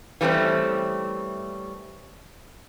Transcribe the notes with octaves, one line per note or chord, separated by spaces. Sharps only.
E3 G3 A3 C4 C#4